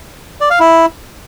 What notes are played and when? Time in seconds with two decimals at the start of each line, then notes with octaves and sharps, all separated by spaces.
0.41 D5
0.50 F5
0.60 E4